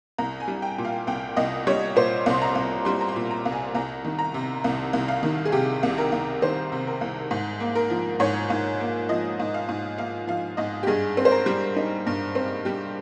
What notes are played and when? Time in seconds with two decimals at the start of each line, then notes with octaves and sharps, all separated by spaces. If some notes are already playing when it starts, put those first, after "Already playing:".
0.18 C2 A#5
0.40 G#5
0.48 G3
0.62 G5
0.78 A#2
0.85 F5
1.07 C2 G5
1.36 C2 D#5
1.67 G3 C#5
1.96 A#2 C5
2.26 C2 C6
2.42 A#5
2.55 C2
2.85 G3 C6
3.01 A#5
3.08 C6
3.16 A#2
3.31 A#5
3.45 C2
3.52 G#5
3.75 C2 A#5
4.05 D#3
4.19 A#5
4.34 C3
4.64 C2
4.93 C2
5.08 F5
5.23 D#3
5.45 G#4
5.52 C3 G4
5.83 C2
5.98 A#4
6.12 C2
6.42 D#3 C5
6.72 C3
6.87 A#4
7.01 C2
7.31 G#2
7.60 A#3
7.75 A#4
7.90 F3
8.20 G#2 C#5
8.50 G#2
8.80 A#3
9.09 F3 D#5
9.39 G#2
9.54 F5
9.69 G#2
9.98 A#3 F5
10.27 F3 F5
10.57 G#2 D#5
10.83 G4
10.87 G2 G#4
11.17 C4
11.25 C5
11.31 A#4
11.46 G3
11.76 D#4
12.07 G2
12.35 C4
12.65 G3 G4